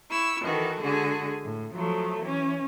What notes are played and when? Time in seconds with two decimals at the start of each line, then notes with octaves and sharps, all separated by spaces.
0.11 E4 C#6 E6
0.44 D#3 E3 F#4 A4
0.81 D3 G#3 F#4 G#4
1.43 A2
1.73 F3 F#3 A3
2.22 E3 C#4